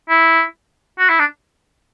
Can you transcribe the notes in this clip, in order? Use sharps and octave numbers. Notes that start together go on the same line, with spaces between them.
E4
F#4
E4
D4